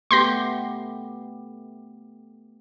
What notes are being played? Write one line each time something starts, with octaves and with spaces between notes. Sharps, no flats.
A3 B3 G4 C6 G6 A#6